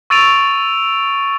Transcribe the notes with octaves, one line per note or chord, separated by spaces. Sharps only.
C#6 E6 A6 D7 D#7 F7